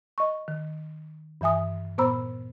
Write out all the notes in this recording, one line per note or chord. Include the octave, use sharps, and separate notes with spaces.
D#5 C#6
D#3
G2 E3 E5 G#5 D#6
A#2 B3 C5 A#5 B5 E6